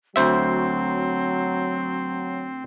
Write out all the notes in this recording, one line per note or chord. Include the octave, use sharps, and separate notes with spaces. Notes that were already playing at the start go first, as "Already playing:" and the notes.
D2 F#3 C4 C5 E5